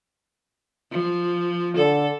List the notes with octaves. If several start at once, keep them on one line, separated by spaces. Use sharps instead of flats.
F3
D3 A4